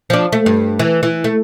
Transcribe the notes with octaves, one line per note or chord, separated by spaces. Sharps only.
F3 D4
A3
G2
E3
E3
A3